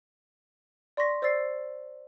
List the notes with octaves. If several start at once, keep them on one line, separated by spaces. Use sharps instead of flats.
D5 C6 C#6 A#6 B6
C5 D5 E6 A6 C7